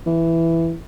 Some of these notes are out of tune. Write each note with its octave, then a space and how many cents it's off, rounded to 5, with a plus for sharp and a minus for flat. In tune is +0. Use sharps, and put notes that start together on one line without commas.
E3 +5